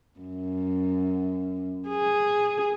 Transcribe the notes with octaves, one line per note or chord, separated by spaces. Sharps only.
F#2
G#4